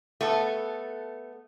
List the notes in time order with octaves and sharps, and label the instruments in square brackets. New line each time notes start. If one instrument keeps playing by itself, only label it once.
[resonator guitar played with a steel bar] A3 B3 A4